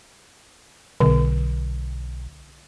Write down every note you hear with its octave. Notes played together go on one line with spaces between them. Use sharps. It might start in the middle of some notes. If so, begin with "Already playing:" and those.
B1 D3